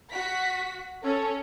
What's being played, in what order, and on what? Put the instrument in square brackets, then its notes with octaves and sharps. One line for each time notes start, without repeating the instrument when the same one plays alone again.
[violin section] F#4 B6
[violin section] C#4 [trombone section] A4